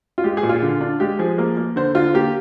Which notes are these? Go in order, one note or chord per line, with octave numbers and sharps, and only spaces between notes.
F4
G#3 G4
G#4
A#2
F4
D3
D4
G#3 G4
F3 G#4
A#3
A#3
D3 C5
D3 F4
A#3 G4